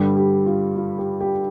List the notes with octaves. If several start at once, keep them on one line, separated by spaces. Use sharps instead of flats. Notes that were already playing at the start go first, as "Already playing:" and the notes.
Already playing: G2 D3 G3 G4
G4
F4
F4
G4
G4